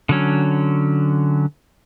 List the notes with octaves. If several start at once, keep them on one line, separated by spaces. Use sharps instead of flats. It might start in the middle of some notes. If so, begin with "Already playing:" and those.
D3 F#3 C#4